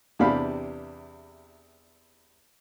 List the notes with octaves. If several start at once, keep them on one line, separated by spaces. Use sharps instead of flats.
E2 C3 D4 G4 F5 B5